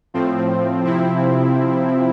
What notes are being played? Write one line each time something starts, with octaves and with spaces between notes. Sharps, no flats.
A2 F3 C4
C3 F3 C4 E4